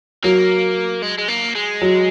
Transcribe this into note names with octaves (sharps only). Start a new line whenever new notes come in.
F#3 A#3
G#3
G#3
A#3
G#3
F#3